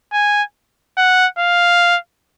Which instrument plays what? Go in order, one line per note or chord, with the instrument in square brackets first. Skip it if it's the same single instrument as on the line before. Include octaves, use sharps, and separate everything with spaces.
[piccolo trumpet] G#5
F#5
F5